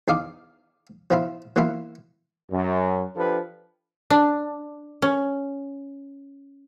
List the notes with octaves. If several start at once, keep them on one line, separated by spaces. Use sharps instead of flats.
E2 D#4 F5 D6
F3 B3 E4 F4
E3 A#3 B3 E4 F4
F#2
F3 D4 G4 A4 B4
D4
C#4